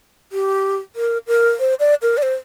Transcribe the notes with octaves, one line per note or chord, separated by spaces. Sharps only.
G4
A#4
A#4
C5
D5
A#4
D5
C5